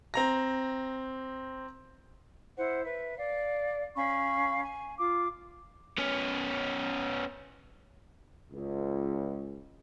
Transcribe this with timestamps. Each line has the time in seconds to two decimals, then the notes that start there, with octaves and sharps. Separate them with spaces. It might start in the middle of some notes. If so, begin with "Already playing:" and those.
0.14 C4 A#5 A#6
2.58 E4 C5 F#5
2.84 B4 E5
3.17 D5 F5
3.96 C#4 F5 B5 C#6
4.64 G#5
4.99 F4 F5 D6
5.98 B3 C#4
8.53 C#2